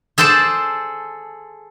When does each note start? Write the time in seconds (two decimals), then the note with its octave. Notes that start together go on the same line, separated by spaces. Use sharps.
0.18 G#4 A4 C5 D5 A5